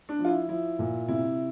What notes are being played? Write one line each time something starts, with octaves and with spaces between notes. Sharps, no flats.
D4
F3
F4
E4
F3 E4
A#2
C3 E4